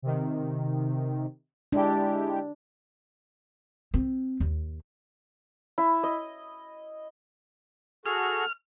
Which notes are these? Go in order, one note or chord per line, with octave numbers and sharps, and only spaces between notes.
C3 D#3
G#3 D4 E4 G4
C4
D#2
E4
D#5
F#4 G#4 A4 F6